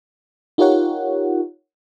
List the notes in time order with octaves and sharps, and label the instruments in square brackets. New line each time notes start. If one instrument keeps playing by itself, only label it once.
[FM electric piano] D#4 F4 G4 A#4 C#5 F#5